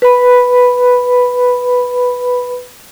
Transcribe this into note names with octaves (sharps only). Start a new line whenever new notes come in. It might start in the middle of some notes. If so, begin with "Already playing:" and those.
B4 B5